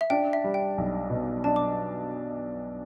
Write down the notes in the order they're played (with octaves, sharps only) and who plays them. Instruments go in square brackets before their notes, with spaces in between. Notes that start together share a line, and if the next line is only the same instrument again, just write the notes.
[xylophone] E5
[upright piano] D4 [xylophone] G5
[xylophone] E5
[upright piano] G3
[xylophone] G5
[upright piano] B1
B2
[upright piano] D4 [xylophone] A5
[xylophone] D6